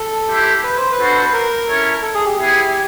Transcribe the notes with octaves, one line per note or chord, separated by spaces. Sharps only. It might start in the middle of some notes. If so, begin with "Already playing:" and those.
Already playing: A4
E4 G4 C5 E5
B4
C5
B4
D4 F#4 A4 C5
B4
A#4
C#4 E4 A4 C#5
A4
G#4
G4
B3 E4 G#4